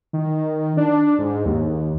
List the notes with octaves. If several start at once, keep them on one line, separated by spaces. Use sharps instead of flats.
D#3
D4
G#2
D#2